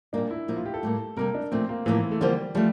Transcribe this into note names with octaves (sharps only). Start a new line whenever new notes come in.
A#2 G3 A#3 D4
E4
A#2 F3 A#3
F4
G4
A4
A2 G3 A#3
C3 G3 A#3 A#4
D4
A#2 F3 A3 C4
A#3
A2 E3 F3 A#3
A3
D3 F3 G3 A#3 F4 C5
F3 G3 A3